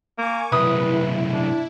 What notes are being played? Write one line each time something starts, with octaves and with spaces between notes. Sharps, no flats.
A#3 G#5 C#6 D6
C2 F#2 E4 B4 D#6
D4